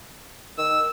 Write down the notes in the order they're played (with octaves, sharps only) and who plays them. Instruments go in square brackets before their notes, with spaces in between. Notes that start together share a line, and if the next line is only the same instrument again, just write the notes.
[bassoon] D#3 [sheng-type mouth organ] E6